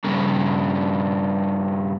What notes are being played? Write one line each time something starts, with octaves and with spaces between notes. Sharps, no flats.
G2 C#3